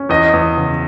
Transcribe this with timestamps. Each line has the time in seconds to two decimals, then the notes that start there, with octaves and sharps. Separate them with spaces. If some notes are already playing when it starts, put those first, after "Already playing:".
Already playing: C#4
0.09 E2 D#5
0.33 E2
0.57 C#3